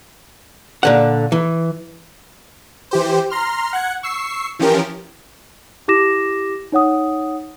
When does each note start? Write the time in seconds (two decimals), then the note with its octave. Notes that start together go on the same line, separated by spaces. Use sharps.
0.83 A#2 D3 F#5
1.32 E3
2.91 E3 G4 C5
3.30 A#5 C6 F6
3.73 F#5 F#6 G#6
4.03 C#6 E6 C7
4.59 E3 F3 C#4 G4 A#4
5.88 E4 G4 D6 A#6 E7
6.72 D#4 C#5 F#5 D#6